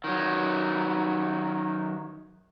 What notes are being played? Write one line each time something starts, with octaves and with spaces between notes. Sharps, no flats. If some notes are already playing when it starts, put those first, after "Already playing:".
D#3 F#3